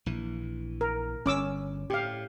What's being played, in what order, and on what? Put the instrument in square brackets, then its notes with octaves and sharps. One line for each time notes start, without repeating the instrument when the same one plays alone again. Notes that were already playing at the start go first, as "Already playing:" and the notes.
[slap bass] A#1 E3
[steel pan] A#4
[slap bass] G1 [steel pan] C#4 D6 E6
[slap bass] A2 [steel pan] G4 F5